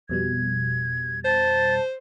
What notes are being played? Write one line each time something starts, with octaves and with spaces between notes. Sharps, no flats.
F2 B2 G3 G#6
C5 A5 A6